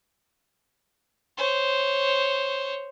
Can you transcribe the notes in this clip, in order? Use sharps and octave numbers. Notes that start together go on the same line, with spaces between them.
C5 C#5